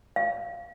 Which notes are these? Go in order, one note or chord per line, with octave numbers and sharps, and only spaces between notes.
F5